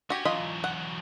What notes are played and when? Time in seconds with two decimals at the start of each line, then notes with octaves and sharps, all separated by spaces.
0.10 C#4 F#4 G4 G#5
0.25 E3 F#3 F4 D#5 B5
0.64 F#5